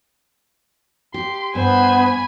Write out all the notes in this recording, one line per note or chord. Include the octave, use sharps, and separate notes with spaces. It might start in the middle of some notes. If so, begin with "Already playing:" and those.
G4 C6
G2 B3 C5 G#5 B5